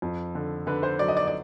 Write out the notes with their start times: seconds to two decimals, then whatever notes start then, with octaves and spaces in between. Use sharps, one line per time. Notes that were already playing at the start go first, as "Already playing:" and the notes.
0.02 F2
0.35 D3
0.67 D3 B4
0.83 C5
0.99 F#3 D5
1.08 D#5
1.17 D5
1.28 D5